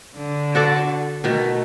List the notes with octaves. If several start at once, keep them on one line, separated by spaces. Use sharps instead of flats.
D3
F#4 A4 D5
B2 D#3 A3